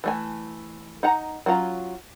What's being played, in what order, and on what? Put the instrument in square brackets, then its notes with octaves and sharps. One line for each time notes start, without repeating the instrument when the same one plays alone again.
[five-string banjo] E3 A3 G#5
D#4 F#5 A#5
F#3 C#4 F4 A#5